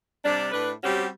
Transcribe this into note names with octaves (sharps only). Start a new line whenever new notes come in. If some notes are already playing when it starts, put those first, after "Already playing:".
C3 G3 D4
A2 D4 B4
G3 C4 C#4 F#4 G4